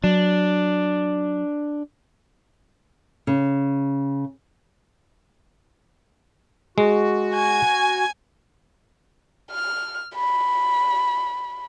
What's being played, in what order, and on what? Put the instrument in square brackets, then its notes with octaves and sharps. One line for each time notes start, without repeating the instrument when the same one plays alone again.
[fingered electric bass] F#3 [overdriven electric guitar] D4
[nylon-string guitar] C#3
[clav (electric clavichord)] G#3 [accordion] F#4
[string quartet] G#5 G#6
[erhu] F6
B5